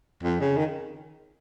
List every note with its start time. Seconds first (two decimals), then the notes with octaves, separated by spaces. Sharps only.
0.23 F2
0.41 C#3
0.57 D#3